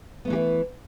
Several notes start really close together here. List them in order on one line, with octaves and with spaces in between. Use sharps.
B3 A3 E3 G4 E4